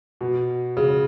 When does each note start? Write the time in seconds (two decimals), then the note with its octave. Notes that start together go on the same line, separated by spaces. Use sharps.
0.21 B2
0.77 C#3